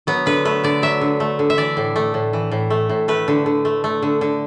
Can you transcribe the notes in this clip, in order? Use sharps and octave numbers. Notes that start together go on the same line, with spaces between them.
F#3 B3
D3 B4
A3 B4
D3 D5
F#3 E5
D3
A3
D3
E5
E3 D5
A2
A3
A2
E3
A2
A3
A2
A3 B4
D3
D3
A3
A3
D3
D3